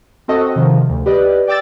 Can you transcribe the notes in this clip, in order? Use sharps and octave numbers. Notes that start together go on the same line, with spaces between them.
C4 F#4 A4 D#5
C3 D#3 F3
D2
G4 B4 D5 D#5
D5 G5 D6 E6 A6